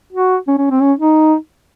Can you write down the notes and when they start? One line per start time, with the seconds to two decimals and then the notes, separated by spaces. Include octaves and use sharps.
0.13 F#4
0.47 C#4
0.58 C#4
0.70 C4
0.81 C#4
0.99 D#4